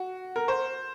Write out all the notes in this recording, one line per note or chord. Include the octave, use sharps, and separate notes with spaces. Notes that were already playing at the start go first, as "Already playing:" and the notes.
Already playing: F#4
A#4
C5